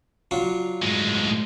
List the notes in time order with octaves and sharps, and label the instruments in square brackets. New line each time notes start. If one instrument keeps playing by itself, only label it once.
[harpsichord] F#3 D4 F4
[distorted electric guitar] A2 G#3